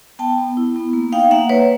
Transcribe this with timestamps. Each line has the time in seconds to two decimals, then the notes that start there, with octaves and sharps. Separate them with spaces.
0.19 B3 G5 A5
0.38 B3
0.57 E4
0.76 B3
0.93 A#3
1.12 D#4 F5 G5
1.31 A#3 E5 F#5
1.49 A#3 B4 C#5